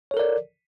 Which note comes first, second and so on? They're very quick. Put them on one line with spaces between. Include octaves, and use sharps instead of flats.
C#5 A4 A#4 D5